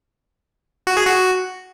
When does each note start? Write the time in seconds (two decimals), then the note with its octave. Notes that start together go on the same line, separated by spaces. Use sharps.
0.87 F#4
0.97 G#4
1.07 F#4